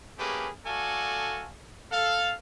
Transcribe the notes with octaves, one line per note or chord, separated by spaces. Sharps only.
A3 A#3 C#4 G4 G#4 B4
A3 F#4 A4 D5 F5 G#5
A4 F5